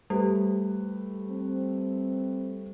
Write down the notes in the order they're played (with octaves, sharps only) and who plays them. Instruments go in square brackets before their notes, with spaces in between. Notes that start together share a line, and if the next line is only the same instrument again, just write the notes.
[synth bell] G3 [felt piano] A3 G4 B4
[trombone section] C4